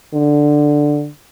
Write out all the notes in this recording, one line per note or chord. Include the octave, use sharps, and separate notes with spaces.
D3